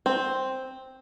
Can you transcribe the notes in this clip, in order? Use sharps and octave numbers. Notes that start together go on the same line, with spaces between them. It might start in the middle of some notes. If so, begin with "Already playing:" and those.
C4